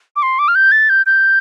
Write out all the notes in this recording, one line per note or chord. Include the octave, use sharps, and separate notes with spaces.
D6
C6
D6
F6
G6
A6
G6
G6